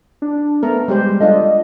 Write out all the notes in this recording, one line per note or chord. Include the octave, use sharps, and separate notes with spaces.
D4
A3 B3 A#4
G3 G#3 G4 C5
D4 F4 A4 D#5